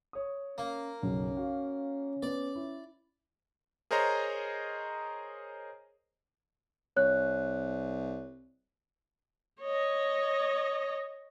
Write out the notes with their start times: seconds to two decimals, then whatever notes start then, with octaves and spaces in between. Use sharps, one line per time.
0.13 C#5 D#6
0.58 A#3 C#4
1.03 B1 F#2 C#3 C#4
1.37 F#4 F5
2.23 B3 D5
2.55 E4
3.91 G#4 A#4 C5 C#5 D#5 A#5
6.97 C2 C#5 F#6
9.62 C#5 D#5